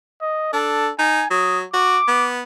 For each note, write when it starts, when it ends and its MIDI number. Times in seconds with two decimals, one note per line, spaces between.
0.22 0.49 75
0.53 0.89 62
0.53 0.92 69
0.99 1.23 63
0.99 1.27 80
1.31 1.64 54
1.31 1.58 87
1.74 1.98 66
1.74 2.29 86
2.08 2.42 59